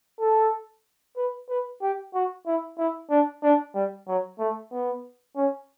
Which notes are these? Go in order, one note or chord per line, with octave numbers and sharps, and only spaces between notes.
A4
B4
B4
G4
F#4
E4
E4
D4
D4
G3
F#3
A3
B3
C#4